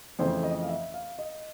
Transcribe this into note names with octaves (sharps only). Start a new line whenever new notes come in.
F2 C#3 E3 A3 C5
D#5
F5
E5
F5
D#5